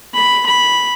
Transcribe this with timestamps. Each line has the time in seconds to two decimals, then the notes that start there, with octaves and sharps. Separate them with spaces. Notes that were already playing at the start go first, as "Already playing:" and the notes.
0.15 B5
0.46 B5